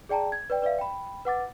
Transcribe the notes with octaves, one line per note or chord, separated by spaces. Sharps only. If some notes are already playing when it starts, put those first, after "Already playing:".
G#4 D5 G5 A5 A#5
G#6
B4 D5 G5
B4 D5 E5 F5
G5 B5
B4 F#5 D6 A6